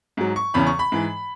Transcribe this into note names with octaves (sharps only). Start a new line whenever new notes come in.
G#2 F#3
C#6
E2 C#3 E3 B5
C#6
B5
G#2 E3